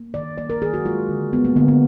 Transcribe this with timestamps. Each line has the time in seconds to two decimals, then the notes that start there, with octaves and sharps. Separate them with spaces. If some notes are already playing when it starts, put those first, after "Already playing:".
Already playing: A#3
0.14 D#3 D5
0.38 A#3 D5
0.50 A#4
0.62 D#3 G#4
0.74 F#4
0.85 G#3 F4
1.09 D3
1.32 G#3 B3
1.45 A#3
1.56 D3 B3
1.68 B3